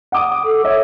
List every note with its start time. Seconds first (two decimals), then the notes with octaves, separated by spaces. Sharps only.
0.12 F#5 D6 D#6
0.45 A4
0.65 C#5 E5